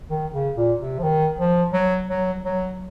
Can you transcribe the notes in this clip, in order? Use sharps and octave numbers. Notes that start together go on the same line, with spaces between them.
D#3
C#3
A#2
C3
F3
D#3
F3
F#3
F#3
F#3